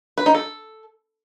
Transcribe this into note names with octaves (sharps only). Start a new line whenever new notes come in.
B4
D#4
A4